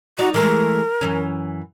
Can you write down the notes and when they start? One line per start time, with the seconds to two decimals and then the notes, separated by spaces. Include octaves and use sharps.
0.19 D#4 F#4 D5
0.34 E3 G#3 A3 A#4
1.01 F#2 E3 C#4